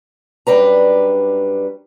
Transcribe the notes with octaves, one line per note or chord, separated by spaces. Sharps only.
F#2 G3 D4 B4 A#5